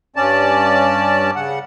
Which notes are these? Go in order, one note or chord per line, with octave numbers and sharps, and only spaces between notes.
G2 C#4 D5 A5
C#3 F#5